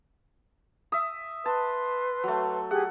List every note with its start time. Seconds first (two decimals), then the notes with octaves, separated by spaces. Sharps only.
0.92 E5 D#6
1.46 B4 A5 C6
2.24 F#3 A3
2.71 G4 G#4 F#5